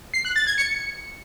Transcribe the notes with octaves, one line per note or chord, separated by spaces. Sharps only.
C7
F#6
A6
G#6
C#7